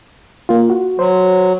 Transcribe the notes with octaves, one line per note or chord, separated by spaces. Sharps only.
A#3 F4
F#4
F#3 C5